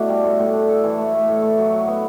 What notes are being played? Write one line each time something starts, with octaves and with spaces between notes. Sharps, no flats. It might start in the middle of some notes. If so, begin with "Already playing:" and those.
Already playing: B2 A3 D4 E4
G3
A2
A2
D4
A4
E3
A3
A2
A2
A3
F#3
F#3
B3